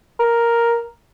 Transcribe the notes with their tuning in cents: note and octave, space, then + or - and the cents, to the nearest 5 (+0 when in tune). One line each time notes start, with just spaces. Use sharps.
A#4 +5